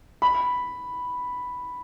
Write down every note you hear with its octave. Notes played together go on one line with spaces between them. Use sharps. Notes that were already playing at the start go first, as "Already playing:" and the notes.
B5